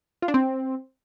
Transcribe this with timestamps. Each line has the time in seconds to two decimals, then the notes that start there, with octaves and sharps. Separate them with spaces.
0.22 F4
0.28 D4
0.34 C4